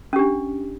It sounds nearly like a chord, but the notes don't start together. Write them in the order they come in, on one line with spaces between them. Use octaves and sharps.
C#4 G4 D4